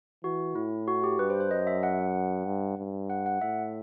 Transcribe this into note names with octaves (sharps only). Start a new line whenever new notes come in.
E3 F#4
A2 E4
F#4
G4
G2 B4
C5
C5
F#2 D#5
E5
F#5
G2
G2
F#5
F#5
A2 E5